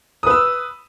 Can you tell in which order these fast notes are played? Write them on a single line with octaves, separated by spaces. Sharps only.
D#6 B4 E6